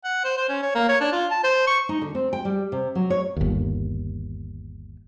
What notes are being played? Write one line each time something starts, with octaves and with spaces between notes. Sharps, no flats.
F#5
C5
C5
C#4
C#5
A#3
C#5
D4
F4
A5
C5
C#6
D#4
D3
C4
G5
G3
C3
F#3
C#5
G1 D#2